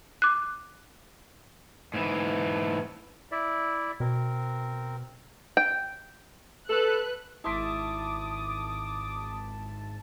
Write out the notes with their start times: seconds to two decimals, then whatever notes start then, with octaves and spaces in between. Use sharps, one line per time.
0.22 D6 F#6
1.94 G#2 E3
3.32 E4 D5 E5
4.00 B2 C4 A#4
5.57 G5
6.70 A4 B4 F#6
7.44 G#1 E4 A5 C6 D6 D#6 B6